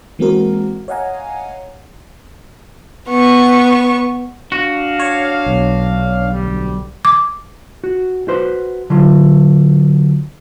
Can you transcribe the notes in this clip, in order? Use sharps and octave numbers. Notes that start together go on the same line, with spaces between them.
E3 G#3 A#3 C4 F#4 A#4
C#5 D#5 F5 F#5 G#5 A#5
B3 C#6
D4 F#4 F5
C#5
B1
D2 G3
D6
F#4
F#4 B4 C5
D3 F#3 F4